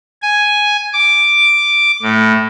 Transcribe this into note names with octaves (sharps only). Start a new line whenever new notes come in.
G#5
D6
A2